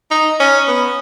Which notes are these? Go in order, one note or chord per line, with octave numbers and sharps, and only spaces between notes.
D#4
C#4
B3